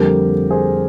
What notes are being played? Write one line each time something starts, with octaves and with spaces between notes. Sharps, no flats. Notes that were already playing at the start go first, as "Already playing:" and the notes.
Already playing: F2 D3 G3 A#3 G4 A#4
G#4 C5